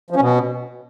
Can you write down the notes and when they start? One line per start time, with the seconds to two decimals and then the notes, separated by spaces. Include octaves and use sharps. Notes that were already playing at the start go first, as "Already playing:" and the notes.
0.11 F3
0.16 C#4
0.21 B2